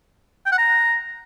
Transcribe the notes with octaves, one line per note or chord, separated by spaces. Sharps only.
G5
F#5
A#5